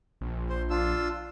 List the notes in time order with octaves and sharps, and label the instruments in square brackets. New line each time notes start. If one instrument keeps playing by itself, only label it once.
[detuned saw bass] A#1
[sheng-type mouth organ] C5
D4 F4 E6